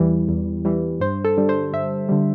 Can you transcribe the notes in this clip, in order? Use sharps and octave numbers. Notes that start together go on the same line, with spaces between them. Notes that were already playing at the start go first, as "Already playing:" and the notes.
Already playing: E2 E3 G3
E2
E3 G3
G2 C5
A4
D3 G3
C5
G2 E5
D3 G3